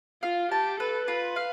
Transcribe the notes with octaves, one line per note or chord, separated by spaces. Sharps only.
F4 F5
G4 A5
A4 B4
F4 B4
F5